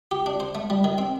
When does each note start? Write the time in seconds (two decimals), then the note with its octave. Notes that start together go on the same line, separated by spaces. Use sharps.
0.11 G4
0.26 D4
0.40 C5
0.55 A3
0.70 G3
0.84 D#3
0.98 C4